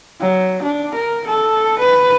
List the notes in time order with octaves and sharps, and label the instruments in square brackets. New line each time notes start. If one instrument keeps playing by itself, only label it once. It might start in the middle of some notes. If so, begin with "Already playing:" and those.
[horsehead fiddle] F#3
D4
A#4
A4
B4